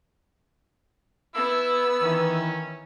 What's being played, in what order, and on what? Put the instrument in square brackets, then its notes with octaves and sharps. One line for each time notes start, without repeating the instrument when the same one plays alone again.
[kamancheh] B3 E6 [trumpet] E4
[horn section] D#3 E3 [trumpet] C#4